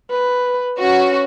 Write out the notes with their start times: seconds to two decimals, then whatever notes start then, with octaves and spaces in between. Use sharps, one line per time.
0.11 B4
0.79 C#4 F#4